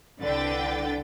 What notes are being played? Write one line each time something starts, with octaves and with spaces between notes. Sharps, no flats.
C2 D3 D4 B4 G5 A6